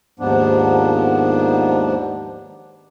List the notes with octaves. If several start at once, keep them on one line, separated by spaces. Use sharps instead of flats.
D#2 G#2 F3 B3 D4